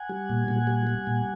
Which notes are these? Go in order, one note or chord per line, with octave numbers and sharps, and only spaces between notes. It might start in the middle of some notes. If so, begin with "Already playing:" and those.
Already playing: F#5 G#5
G3
A#2
A#2
G3
G3
A#2